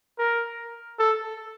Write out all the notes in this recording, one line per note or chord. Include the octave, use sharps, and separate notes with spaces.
A#4
A4